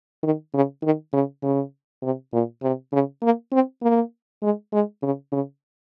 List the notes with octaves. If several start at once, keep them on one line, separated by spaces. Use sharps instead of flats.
D#3
C#3
D#3
C#3
C#3
C3
A#2
C3
C#3
A#3
C4
A#3
G#3
G#3
C#3
C#3